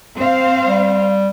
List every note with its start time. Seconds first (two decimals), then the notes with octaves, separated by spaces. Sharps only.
0.17 C4 C5 F5
0.67 G3